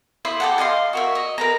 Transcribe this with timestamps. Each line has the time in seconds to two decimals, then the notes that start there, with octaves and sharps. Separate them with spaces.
0.25 E4 C5 B5 D#6
0.40 G4 A4 F#5
0.58 D5 D#5 F5 C6
0.93 F#4 A#4 E5
1.15 D#5
1.38 A#4 B4 A#5